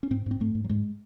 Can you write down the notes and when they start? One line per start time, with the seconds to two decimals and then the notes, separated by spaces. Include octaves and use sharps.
0.03 C#4
0.11 G#2 C4
0.26 G#2 C4
0.40 G#2 A3
0.55 G#2
0.64 F#3
0.69 G#2 G#3